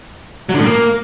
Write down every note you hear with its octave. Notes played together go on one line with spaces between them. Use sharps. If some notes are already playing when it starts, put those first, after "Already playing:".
F#3
D3
A2
A#3